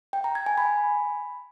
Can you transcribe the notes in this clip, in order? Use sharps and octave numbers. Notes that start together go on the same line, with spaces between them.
G5
A#5
G#6
G#5
B5